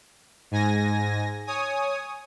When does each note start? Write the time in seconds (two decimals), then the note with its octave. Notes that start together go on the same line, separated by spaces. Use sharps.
0.51 G#2 G#5 A#6
1.47 C#5 G#5 D#6